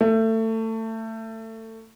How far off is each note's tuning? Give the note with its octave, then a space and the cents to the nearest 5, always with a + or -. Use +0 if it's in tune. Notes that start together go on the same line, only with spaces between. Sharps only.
A3 +25